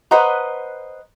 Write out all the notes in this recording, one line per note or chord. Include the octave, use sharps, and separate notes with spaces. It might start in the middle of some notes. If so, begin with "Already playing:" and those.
B4 C5 D#5 F#5 A#5